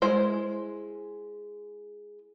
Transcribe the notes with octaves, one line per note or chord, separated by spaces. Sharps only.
G#3 E4 C5